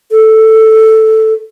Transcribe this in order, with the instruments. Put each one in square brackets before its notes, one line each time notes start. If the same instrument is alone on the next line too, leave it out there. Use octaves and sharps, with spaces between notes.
[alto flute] A4